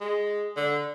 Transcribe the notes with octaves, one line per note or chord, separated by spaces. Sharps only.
G#3
D3